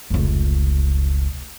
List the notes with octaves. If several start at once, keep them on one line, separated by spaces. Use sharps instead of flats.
F1 C#2